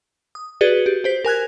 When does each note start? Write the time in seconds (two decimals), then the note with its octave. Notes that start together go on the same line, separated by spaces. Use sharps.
0.35 D#6
0.61 F#4 G#4 B4 D5 A6 G7
0.86 G4
1.04 G4 C5 B6
1.25 A#4 G#5 F#6 G#6